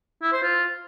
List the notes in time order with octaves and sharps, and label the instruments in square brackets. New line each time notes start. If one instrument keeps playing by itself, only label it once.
[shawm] E4
C5
F4